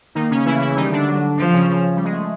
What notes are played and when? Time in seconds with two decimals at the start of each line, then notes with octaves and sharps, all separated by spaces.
0.15 D#3 A#3 D#4
0.31 C#3 C#4
0.45 E3 A3 E4
0.61 E3 E4
0.76 D#3 G3 D#4
0.92 D3 D4
1.07 F#3
1.38 F3
1.53 C#3 C#4
1.96 G3
2.04 G#3
2.13 A3